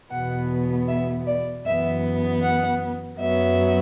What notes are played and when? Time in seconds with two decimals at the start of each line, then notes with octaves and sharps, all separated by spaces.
0.11 E2 B2 B3 F#5
0.88 E5
1.27 D5
1.65 F#2 E3 B3 E5
2.43 F#5
3.19 F#2 F#3 B3 E5